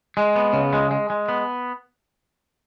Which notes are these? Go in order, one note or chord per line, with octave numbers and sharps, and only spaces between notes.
G#3
B3
C#3
G#3
G#3
G#3
B3